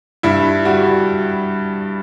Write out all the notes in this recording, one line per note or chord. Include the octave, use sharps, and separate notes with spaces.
G2 E4
G3 F#4